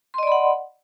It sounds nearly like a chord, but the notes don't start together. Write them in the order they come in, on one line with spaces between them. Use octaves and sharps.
C6 D#5 D5 B5 F#5